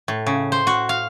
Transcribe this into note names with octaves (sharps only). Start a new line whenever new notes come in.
A2
C#3
C5
F#4
F5